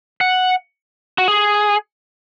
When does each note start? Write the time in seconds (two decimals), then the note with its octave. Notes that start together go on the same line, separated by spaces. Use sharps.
0.21 F#5
1.18 F#4
1.28 G#4